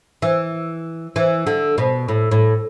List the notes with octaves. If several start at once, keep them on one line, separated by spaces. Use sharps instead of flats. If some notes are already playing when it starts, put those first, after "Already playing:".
E3
E3
D3
B2
A2
A2